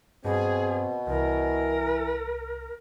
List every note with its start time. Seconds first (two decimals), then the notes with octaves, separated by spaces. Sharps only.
0.25 G2 B2 C4 G#4
1.07 C2 E3 A#4